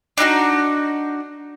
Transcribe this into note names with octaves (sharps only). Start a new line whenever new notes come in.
D4 D#4 F4 F#4